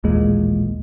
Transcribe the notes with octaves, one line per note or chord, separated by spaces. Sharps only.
A1 D#2 A#2 G#3